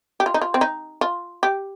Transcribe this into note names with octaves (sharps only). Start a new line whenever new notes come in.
G4
F4
D#4
F4
C4
D#4
F4
G4